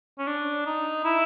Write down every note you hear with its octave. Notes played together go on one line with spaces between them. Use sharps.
C#4
D4
D#4
E4